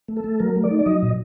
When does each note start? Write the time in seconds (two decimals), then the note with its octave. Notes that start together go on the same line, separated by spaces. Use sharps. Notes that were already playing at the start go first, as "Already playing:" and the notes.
0.08 A3
0.17 A4
0.24 A3
0.40 F#3 A#4
0.56 A3
0.64 D5
0.71 D#4
0.79 D5
0.86 F#3 D#5
1.03 A#2